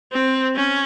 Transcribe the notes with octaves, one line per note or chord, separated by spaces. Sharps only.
C4
C#4